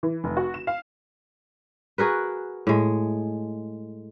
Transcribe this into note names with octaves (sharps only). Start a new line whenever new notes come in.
E3
F1
F#4
E7
F5
F#4 G#4 A#4 B4
A2 G#3